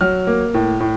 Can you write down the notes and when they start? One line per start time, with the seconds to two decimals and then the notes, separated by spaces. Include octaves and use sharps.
0.01 F#3 F6
0.27 A#3
0.54 A2
0.80 A2